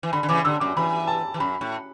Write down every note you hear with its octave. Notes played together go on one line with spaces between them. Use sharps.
E3
D3 B5
D3
C#3 E3 D6
D3 E6
F#2 D6
E3 B5
A5
E3
F#2 B5
A2